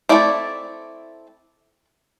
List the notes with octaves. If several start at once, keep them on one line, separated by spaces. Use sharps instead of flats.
A3 C4 E4 D5